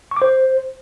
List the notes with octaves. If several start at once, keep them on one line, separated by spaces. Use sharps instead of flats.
C#6
D6
C5